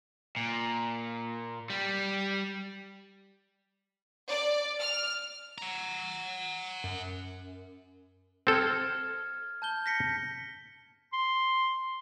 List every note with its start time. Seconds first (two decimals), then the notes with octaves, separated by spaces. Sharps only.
0.36 A#2
1.70 G3
4.29 D5
4.79 F6
5.58 F#5 A#5
6.84 F#2
8.47 C4 A4 F6 G#6
9.62 A5 G6 G7
9.86 A#6 B6 C#7
11.13 C6